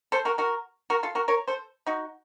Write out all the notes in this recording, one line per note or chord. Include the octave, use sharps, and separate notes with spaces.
A4 C5
F#4 A#4
F#4 A#4
F#4 A#4
F4 A4
F#4 A#4
A#4 C#5
A4 C5
D#4 F#4